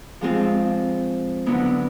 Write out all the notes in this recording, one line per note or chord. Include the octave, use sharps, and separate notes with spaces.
F3 G#3 C4 F4
D3 F#3 B3 E4